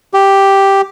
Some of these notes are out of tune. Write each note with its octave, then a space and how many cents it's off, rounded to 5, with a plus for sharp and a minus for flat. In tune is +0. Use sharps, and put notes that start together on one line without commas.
G4 +0